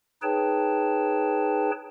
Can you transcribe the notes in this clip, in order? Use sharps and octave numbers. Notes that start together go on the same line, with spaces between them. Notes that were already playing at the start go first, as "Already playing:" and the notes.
D#4 G#4 B4 C#5 G5 A5